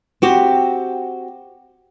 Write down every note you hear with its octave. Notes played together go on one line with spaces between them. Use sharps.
C4 F#4 G4